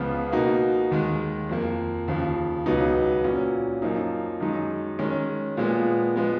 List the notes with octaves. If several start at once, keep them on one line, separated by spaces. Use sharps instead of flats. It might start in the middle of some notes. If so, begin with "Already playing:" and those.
Already playing: C#2 C#3 F3 B3 F4
B2 A#3 D#4 F#4
D#2 D#3 G#3
F2 F3 A#3
D#2 C#3 F3
C#2 B2 F#3 B3 D#4
A#2 F#3 C#4
F#2 F3 A#3 D#4
F#2 D#3 G#3 D#4
D#3 G#3 C#4
A#2 F3 G#3 B3
F3 G#3 B3